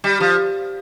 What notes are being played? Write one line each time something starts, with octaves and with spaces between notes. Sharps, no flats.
G3
F3